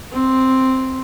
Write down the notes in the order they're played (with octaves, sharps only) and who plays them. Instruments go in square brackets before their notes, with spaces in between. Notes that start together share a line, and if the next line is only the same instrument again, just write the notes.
[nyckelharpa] C4